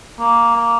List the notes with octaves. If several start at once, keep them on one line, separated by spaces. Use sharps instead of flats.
A#3
A#3